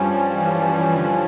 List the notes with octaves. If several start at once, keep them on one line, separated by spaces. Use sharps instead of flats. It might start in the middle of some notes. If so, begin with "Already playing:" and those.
Already playing: G2 F3 G3 C#4
E3
D3